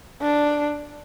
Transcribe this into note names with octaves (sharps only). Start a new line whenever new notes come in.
D4